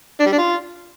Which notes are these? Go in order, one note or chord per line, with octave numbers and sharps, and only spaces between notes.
D4
G3
D4
F4